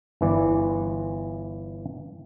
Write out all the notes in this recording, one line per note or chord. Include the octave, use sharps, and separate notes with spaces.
G1 E3 D5